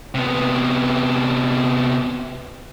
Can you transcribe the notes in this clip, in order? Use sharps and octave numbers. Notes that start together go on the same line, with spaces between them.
C3 B3